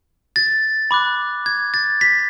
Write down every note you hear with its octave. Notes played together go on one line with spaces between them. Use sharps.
A6
B5 D6 F#6
G#6
A6
B6